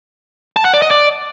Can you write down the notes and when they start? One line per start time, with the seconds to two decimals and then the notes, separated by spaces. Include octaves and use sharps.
0.56 A5
0.65 F#5
0.74 D5
0.82 D#5
0.91 D5